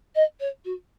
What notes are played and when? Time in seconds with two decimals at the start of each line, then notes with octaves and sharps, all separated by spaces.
0.15 D#5
0.40 C#5
0.65 F#4